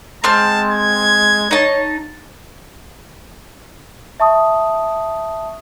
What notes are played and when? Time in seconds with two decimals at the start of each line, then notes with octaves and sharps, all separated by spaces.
0.24 G#3 C4 A5 F6
0.71 G#6
1.51 D#4 C#5 A5
4.20 E5 A5 C#6 D#6